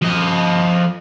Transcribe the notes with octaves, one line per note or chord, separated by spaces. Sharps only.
F3 D#5